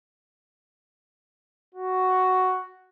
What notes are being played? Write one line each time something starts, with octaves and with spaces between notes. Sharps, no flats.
F#4